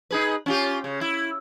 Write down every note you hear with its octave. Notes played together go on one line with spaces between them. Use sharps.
D#4 G#4 B4
C#4 F4 G4
C#3
E4